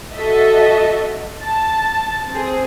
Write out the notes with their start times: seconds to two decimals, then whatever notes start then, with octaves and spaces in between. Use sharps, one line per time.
0.14 F#4 A4 D#5 E5
1.43 A5
2.29 C4 G#4